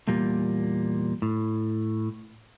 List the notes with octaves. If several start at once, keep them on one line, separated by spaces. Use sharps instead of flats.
E2 A#2 G3 A#3
A2